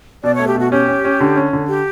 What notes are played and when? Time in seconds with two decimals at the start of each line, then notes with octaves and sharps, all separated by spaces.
0.24 B2 D5
0.35 C#5
0.39 A3
0.48 G4
0.55 B2 F#4
0.71 C#4 G4
0.88 C#4
1.05 C#4
1.20 D3
1.36 C#4
1.53 D3
1.68 G4